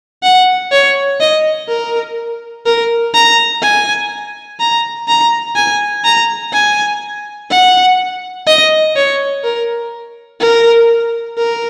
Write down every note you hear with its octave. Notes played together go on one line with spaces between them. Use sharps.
F#5
C#5
D#5
A#4
A#4
A#5
G#5
A#5
A#5
G#5
A#5
G#5
F#5
D#5
C#5
A#4
A#4
A#4